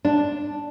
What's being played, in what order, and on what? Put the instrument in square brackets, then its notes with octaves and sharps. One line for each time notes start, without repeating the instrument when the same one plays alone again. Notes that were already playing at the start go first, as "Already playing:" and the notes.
[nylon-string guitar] D4